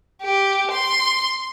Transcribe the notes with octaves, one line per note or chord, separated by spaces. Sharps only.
G4
C6